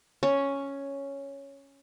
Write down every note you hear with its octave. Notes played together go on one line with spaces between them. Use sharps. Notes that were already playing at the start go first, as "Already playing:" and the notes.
C#4 C#5